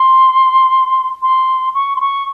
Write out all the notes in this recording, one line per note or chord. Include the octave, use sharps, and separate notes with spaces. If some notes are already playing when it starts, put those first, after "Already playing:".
Already playing: C6
C6
C#6
C6
C#6